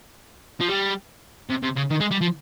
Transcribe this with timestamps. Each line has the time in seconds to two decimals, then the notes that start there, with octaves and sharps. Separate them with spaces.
0.60 F3
0.68 G3
1.49 C3
1.63 C3
1.76 C#3
1.90 D#3
2.00 G#3
2.11 G3
2.21 F3